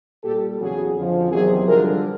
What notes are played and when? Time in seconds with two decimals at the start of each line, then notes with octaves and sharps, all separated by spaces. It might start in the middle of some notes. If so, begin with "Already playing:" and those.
0.23 A#2 G3 G4 A4
0.59 E2 C#3 F#3 F#4 G#4
0.95 F2 D3 F3
1.31 E2 C3 D#3 F#3 F#4 G#4
1.67 G2 D3 F3 G#4 A#4